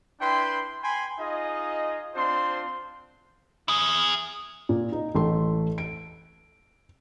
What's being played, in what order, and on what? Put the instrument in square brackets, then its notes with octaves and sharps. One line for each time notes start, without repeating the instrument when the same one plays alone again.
[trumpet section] D4 E4 B4 G5 B5 C6
G5 G#5 B5 C6
D#4 F4 G#4 D#5
C4 D4 F4 C5 C6
[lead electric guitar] E4 G#4
[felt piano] A#2
D#4
A1 A3 C6
D7